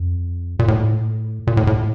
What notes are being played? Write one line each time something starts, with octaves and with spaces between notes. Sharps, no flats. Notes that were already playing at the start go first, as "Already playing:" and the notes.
Already playing: F2
A#2
A2
A#2
A2
A2